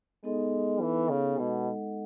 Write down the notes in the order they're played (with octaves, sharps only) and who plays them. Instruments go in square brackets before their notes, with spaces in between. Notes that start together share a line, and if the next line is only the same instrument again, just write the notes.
[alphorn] G#3 [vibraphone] B3 D#4 A4
[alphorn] E3
C#3
[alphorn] B2 [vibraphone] G#3 D#4 A4 D#5 F#5